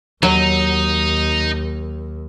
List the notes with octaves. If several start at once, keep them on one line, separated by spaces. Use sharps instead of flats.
D#2 F#3 D#4